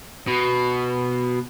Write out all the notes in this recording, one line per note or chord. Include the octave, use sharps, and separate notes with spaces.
B2